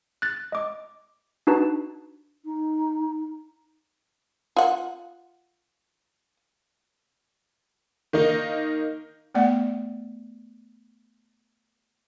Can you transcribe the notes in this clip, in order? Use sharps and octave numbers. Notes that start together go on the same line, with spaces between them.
F#6 A6
D#5 D6
D4 D#4 F#4 B4 A5
D#4
F4 F#5
D#3 A#3 D#4
A3 B3 D5 F#5